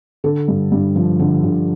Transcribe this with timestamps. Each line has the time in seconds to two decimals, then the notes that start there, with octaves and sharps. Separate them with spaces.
0.24 D3 A4
0.48 G2
0.72 G2
0.96 F3
1.19 D3
1.44 D3